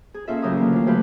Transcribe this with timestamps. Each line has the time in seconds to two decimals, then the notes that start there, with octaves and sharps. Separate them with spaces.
0.14 G#4
0.27 A#2 C#4 F4 G#4 A4 E5
0.42 A2 C#3 F#3 G4 A#4 D#6
0.57 D3 E3 A#3
0.73 D2 F4
0.86 C#3 F#3 A3 F4 G4 B4